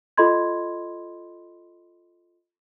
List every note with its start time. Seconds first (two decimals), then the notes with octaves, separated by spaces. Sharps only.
0.18 F4 A4 D#5 B5 C6 G#6